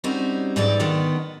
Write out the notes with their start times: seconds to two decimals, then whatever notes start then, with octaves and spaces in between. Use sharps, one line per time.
0.04 G3 C4 C#4 D#4 F#4
0.56 G#2 E3 F#3 G3 D#4 D5
0.80 D3 D#3 B3